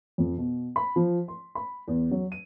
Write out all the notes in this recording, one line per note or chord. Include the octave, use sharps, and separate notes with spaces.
F2
B2
B5
F3
C6
B5
E2
F#3
D#7